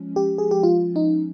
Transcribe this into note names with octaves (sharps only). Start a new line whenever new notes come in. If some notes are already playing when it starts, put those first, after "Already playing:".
Already playing: F3 G#3 C#4
G4
G#4
G4
F4
D#4